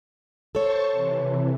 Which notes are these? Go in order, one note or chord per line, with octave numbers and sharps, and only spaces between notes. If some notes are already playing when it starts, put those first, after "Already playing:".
A4 C5 C#5 A5 C#6
C3 E3